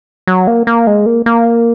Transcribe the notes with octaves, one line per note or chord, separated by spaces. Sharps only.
F#3
A#3
A#3
G#3
A#3
A#3